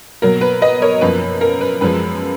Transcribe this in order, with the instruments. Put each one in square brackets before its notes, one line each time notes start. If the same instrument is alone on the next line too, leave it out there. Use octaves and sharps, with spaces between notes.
[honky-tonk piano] B2 F#3 A#3 A#4
B4
B4 D#5
A#4 C#5
F#2 F3 A#3 B4
A#4
B4
F#2 F3 G#3 B4